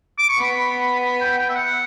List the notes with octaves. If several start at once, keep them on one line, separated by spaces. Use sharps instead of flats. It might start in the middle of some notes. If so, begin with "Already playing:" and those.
D6
C#6
B3 B5
B5
G5
G5
E5
F#5